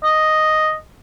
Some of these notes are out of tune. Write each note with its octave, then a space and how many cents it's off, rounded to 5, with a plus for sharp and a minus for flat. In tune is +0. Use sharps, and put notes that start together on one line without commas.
D#5 +0